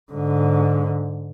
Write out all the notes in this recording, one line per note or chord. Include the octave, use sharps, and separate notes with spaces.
G#2 D3